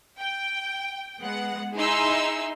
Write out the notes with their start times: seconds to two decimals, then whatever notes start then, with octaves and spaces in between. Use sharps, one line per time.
0.19 G5
1.22 G#3 B3 F#5
1.76 D#4 E4 G#4 C6 E6